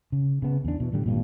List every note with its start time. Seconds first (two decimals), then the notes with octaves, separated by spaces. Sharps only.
0.12 C#3
0.42 C#3 B3
0.64 E2 D4
0.80 B2 E3
0.93 A2 D3 G3
1.06 G#1 G2 A#2